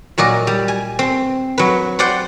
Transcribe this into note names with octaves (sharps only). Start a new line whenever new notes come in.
A#2 F#3 D5 D#5
G3
G#5
C4
F#3 B4
C5 D5 F#5 G5